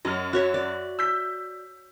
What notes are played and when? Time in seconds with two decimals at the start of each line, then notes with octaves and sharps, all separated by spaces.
0.05 F#2 F#3 D#5 F6
0.33 F#4 C#5 E5
0.54 D5
0.99 E6 G6 B6